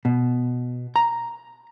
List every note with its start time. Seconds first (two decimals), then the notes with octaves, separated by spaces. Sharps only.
0.05 B2
0.96 A#5